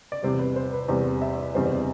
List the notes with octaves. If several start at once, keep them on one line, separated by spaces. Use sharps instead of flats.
D5
E2 C3 G3 C5
B4
C5
B4
E2 C3 G3 C5
E5
F#1 E2 C3 G3 C4 C5